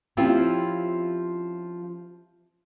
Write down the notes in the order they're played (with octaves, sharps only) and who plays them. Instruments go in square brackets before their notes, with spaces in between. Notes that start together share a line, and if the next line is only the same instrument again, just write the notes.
[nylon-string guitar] F3 C4 C#4 E4 F4 G4